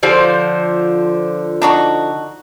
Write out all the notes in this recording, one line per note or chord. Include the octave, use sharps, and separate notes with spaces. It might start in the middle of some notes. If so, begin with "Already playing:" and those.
D3 F3 C5
D4 D#4 F#4